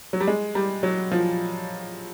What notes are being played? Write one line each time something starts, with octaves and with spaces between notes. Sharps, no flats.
F#3
G3
G#3
G3
F#3
F3